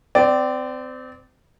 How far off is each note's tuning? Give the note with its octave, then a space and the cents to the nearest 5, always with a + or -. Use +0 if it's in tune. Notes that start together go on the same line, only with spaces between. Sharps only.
C4 -30 D5 +0